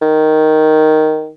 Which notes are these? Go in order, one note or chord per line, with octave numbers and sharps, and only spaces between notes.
D#3